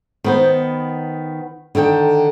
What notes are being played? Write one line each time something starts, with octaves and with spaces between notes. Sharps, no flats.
D#3 B3 C5
D3 D#3 A4 G5